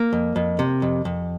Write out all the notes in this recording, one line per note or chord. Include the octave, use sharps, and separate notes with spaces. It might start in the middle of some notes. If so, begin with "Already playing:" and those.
Already playing: A#3
F2
F2
C3
F2
F2